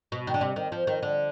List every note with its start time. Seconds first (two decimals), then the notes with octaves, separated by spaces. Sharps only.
0.12 B2
0.27 D#3
0.34 D3
0.41 C3
0.56 D#3
0.72 F3
0.87 D#3
1.03 D3